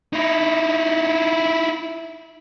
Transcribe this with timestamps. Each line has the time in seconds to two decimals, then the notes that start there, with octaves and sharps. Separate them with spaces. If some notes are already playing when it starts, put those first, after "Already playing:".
0.13 D#4 E4